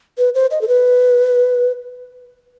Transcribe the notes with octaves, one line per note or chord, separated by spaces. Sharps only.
B4
C5
D#5
A4
B4